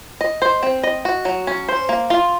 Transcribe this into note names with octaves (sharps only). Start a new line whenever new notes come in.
D#5
C5
C4
D#5
F#4
F#3
C#4
C5
A#3
F4